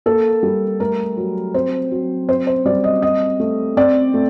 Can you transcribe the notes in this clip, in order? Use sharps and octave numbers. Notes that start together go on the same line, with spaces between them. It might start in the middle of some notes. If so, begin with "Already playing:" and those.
A#3 A4
G3
A3 A#4
F#3
C4 C5
F#3
C4 C5
C5
G3 D5
D#5
C4 D#5
A3
C4 D5
A3